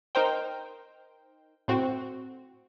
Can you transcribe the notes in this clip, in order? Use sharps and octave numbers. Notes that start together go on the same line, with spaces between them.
D#4 A#4 C5 G5
A2 C4 F#4